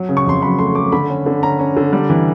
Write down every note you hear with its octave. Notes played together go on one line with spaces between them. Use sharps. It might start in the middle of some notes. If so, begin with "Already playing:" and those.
Already playing: F#3
C#3
C#6
F2 C6
F#3 B5
A3 C6
A3 D6
D3 B5
C#4
D3
C#4 A#5
C#4
D3
G3
E3